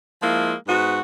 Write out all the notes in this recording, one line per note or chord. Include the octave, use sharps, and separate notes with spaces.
F3 G#3 A#3 E4
G#2 B3 F#4